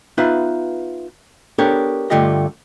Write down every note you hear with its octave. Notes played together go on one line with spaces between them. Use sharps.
B3 D#4 F4 B4 E5 F#5
B3 D4 G4 A4 A#4 C#5
G2 D3 A3 F4 G4 D#5